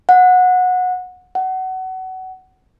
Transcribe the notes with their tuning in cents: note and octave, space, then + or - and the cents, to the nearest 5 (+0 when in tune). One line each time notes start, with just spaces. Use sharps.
F#5 -20
F#5 +25